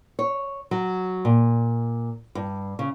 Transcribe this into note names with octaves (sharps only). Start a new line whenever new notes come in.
C#5
F#3
A#2
G2
C#3